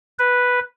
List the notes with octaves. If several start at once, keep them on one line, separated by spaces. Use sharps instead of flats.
B4